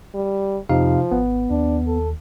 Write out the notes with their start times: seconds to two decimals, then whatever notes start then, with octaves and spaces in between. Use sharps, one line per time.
0.14 G3
0.69 F2 C3 F3 D#4 F5
1.12 G#1 B3
1.50 D#2 D4
1.87 A4